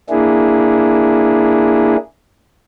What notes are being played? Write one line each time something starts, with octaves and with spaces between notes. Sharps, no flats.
A#3 D4 E4 G#4